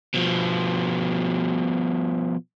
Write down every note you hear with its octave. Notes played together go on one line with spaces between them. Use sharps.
B2 F3